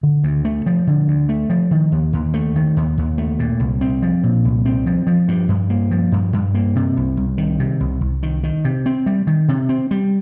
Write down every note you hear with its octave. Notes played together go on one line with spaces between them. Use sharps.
D3
D2
A3
F3
D3
D2
A3
F3
D#3
D#2
D#2
A3
D#3
D#2
D#2
A3
A#2
C2
C4
F3
A#2
C2
C4
F3
F3
G2
G2
A#3
F3
G2
G2
A#3
C3
C2
C2
D#3
C3
C2
C2
D#3
D#3
C3
C4
G3
D#3
C3
C4
G3